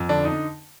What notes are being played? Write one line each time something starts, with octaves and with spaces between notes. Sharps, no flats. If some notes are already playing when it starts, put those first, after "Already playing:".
Already playing: F2
D3 D4
D#4